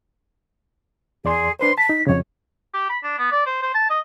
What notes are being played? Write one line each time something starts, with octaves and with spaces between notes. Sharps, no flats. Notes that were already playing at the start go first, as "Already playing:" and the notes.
E2 G#4 D5 C6
D4 B4 C5 C6
A5 B6
D#4
F2 C#3 C#5
G4
B5
D4
B3
D5
C5
C5
A5
D#5